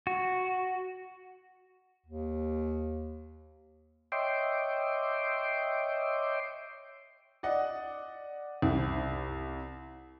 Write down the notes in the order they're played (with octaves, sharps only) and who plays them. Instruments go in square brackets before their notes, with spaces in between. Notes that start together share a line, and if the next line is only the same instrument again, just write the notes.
[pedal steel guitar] F#4
[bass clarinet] D#2
[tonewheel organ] C#5 D#5 E5 G5 C6 D6
[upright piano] D5 D#5 F#5
C2